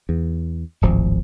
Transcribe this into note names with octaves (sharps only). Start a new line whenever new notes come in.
E2
D1 G#1 F3